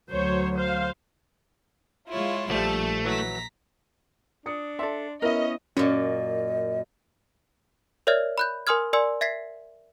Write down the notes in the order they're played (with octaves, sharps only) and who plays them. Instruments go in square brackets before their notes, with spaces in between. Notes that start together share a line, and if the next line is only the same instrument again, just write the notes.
[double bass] D2 F#3 [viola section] C5 C#5
[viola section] C5 F5
[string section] G#3 F4 [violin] E4 C#5
[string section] A#1 [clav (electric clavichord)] F3 G3 [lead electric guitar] A3 [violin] A5
[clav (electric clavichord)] E3 F#3 E4 [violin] A#5 B6
[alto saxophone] D4 [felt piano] D#6 C#7
[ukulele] A4 D5 E5 [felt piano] C6
[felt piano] B3 E4 E5 [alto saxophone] C#4 [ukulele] A#4 [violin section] D#5
[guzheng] F#2 A#2 [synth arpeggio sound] C#4 [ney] D#5
[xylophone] A#4 C#5 D5 E5 F6 G#6
B5 F#6 G6
A#4 G#5 C6 D#6 F6 G#6
A#4 D5 G#5 C6 E6
E5 G#6 B6 C7